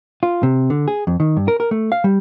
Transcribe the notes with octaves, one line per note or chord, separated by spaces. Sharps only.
F4
C3
D3
G#4
F2
D#3
G2
A#4
A#4
A3
F5
G3